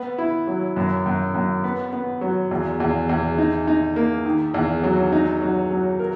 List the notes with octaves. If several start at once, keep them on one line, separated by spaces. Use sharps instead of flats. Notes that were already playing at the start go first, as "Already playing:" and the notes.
Already playing: B3
E4
F#3
F#2
F#2
F#2
B3
B3
F#3
E2
E2
E2
D#4
D#4
A#3
D#3
E2
F#3
D#4
F#3
F#3
A#4